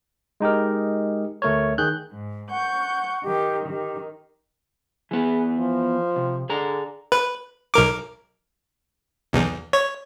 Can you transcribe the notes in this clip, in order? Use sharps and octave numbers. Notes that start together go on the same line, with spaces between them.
G#3 D#4 G4 A#4
D2 A3 A#4 C#5
D#3 G#4 F#6 G6
G#2
F#5 C#6 G6
D#3 G4
D#3 G4
E3 B3 G#4
F3
C3
D3 G#4 A#5
B4
B1 A#4 D6
B1 E2
C#5